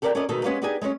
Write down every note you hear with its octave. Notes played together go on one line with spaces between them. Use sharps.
G4 A4 A#4 D5 D#5 G5
C#4 F4 A4 A#4 D5 D#5
D2 B2 D#3 G#3 D#4 A4
G#3 B3 C#4 G4 B4 F5
B3 D4 D#4 G4 G#4 G#5
G#3 A3 C4 C#4